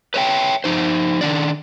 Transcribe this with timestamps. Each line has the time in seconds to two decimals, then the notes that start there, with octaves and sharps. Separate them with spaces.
0.14 B4 C#5 E5 G5
0.64 F3 D#4 C5
1.21 D#3 D4 D5